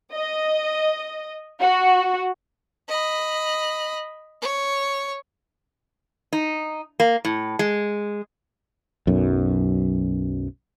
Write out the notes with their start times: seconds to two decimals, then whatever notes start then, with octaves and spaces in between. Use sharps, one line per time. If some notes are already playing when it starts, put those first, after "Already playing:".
0.13 D#5
1.60 F#4
2.88 D#5 B5
4.42 C#5
6.33 D#4
7.00 A#3
7.25 A2
7.59 G#3
9.07 B1 F#2